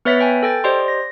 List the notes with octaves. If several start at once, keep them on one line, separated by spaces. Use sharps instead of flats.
B3 B4 C#5 E5 A6 B6
B4 G5 G#5
A4 G5 A6
G4 C5 D5 D#5 C6
A#6